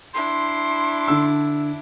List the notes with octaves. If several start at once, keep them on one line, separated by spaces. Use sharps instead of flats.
D4 E4 C6
D3 E6